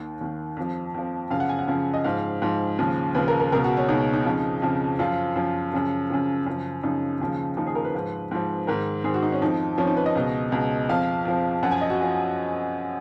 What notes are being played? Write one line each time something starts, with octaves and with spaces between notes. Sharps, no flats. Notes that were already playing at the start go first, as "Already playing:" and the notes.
Already playing: D#2 D#3
D#2 D#3
F2 F3
F2 F3
F#2 C#3 F3 F5
F#5
G#5
F#5
F#2 C#3 F3
D#5
G#2 F3 F5
G#2 F3
D#2 C#3 F3
D#2 C#3 F3 B4
A#4
A#4
C#2 B2 A#4
F#4
C#4
C#2 B2 D#4
D#4
F2 C#3 F3
F2 C#3 F3
F#2 F3 F4
F#2 F3
F#2 C#3 F3
F#2 C#3 F3
F#2 C#3 F3
F#2 C#3 F3 D#4
D#2 C#3 F3
D#2 C#3 F3 D#4
G#4
A#4
B4
G#2 F3
G#2 F3
G#2 D#3 A#4
G#2 D#3 G#4
F#4
D#4
C#4
F2 F3 D#4
F2 F3 C#4
D#4
B4
D#5
C#2 B2
C#2 B2
F2 F3 F5
F2 F3
F#2 F3 F#5
G#5
D#5
F#4
F3